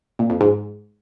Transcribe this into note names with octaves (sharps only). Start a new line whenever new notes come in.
A#2
F2
G#2